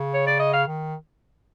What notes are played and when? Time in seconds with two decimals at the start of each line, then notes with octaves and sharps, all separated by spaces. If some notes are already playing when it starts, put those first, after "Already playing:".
Already playing: C#3
0.14 C#5
0.27 D5
0.39 D#5
0.53 F5
0.67 D#3